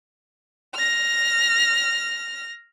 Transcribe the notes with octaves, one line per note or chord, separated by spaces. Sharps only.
F6 A#6